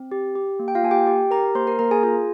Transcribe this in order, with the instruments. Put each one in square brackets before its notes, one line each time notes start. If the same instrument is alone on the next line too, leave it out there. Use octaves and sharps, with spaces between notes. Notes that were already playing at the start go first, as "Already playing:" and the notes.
Already playing: [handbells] C4
G4
G4
A#3
G5
F4 F5
A#3 G#5
G4 G5
G4 G5
G4 A#4 A#5
A#3 C5 C6
A#4 A#5
A#3 A#4 A#5
G#4 G#5
F4 G#4 G#5